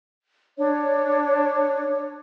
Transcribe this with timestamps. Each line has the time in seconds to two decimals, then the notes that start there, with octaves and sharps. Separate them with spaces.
0.58 D4 C#5